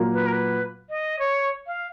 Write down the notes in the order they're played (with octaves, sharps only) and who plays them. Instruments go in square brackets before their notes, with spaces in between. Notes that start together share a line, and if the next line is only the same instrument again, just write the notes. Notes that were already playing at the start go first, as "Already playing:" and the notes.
Already playing: [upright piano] A#2 F#3 A#3
[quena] B4
A#4
B4
D#5
C#5
F5